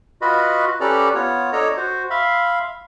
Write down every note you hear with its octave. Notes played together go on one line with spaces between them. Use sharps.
F4 F#4 B4 D#5 B5
C#4 G4 A4 B4 D5 A#5
B3 F4 C#5
D4 A4 C#5 D#5 A#5
F#4 C5
E5 F5 B5 C6